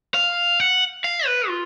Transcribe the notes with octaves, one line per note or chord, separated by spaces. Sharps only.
F5
F#5
F5
B4
F4